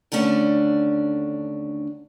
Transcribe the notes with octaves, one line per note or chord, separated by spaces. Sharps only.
D#2 D3 A3 C#4 D4